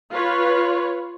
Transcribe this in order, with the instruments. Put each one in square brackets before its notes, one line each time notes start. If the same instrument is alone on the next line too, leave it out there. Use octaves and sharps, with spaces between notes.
[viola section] F4 B4 C#5